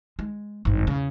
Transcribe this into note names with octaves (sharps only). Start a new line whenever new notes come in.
G#3
G#1 G2
E2 C#3